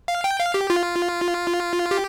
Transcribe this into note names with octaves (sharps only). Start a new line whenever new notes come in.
F5
G5
F5
G4
F4
G4